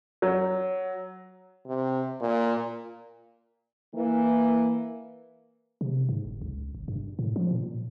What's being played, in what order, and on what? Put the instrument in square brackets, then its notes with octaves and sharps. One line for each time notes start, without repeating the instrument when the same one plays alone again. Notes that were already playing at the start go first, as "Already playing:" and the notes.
[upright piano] F#3
[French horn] C3
A#2
[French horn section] E3 A#3
[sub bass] C3
G#2
F#1
C#2
G1
G2
A2
F3
A#2